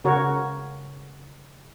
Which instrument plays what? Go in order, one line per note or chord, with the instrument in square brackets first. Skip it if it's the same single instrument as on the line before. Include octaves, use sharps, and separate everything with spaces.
[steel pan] C#3 F#4 A#4 C#5